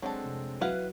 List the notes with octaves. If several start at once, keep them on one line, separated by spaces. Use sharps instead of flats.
F#3 G#3 C4 D4 A4
F1
F#3 E4 B4 F5 F#5